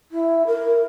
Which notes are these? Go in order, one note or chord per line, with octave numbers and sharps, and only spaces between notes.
E4
A#4